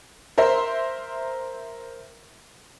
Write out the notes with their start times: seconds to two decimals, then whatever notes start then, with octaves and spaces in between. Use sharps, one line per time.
0.38 A#4 C5 E5 C6